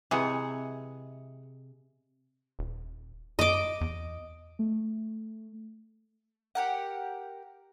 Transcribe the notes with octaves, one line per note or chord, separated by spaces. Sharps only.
C3 E3 G#3 G#4 F#5
D#1
F#2 D#5 D6
E2
A3
G4 A#4 F#5